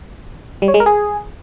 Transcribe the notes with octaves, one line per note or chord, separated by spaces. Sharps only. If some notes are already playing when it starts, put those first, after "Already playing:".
G3
C#5
G#3
A#4
G#4